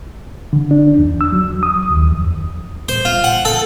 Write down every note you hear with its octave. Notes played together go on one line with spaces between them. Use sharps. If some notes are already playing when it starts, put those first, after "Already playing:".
D3
D4
E2
E6
F#3
D#6
D#2
F2
C5
F4
F#5
A4